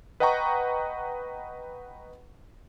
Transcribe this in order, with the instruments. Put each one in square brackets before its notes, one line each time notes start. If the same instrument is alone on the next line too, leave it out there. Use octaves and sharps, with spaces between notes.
[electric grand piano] B4 D#5 F#5 G5 A#5 C#6